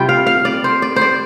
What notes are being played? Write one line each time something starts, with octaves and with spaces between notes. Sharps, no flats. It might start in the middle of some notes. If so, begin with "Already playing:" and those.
Already playing: C3 G3 F4 G5
F5
F5
D5
C5
D5
C5
D5